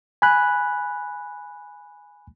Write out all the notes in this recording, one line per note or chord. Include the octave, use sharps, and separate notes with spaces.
G#5 B5 F#6